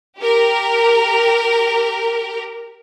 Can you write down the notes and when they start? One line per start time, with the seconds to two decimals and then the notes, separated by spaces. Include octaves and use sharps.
0.19 G4 A#4